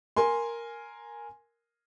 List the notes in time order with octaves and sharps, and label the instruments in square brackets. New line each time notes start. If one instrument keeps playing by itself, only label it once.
[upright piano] A#4 G#5 C6